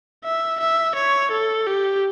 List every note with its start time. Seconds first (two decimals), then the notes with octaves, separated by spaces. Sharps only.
0.24 E5
0.60 E5
0.95 C#5
1.31 A4
1.67 G4